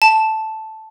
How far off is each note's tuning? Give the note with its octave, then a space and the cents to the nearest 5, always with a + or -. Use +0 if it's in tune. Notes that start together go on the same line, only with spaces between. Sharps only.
A5 -5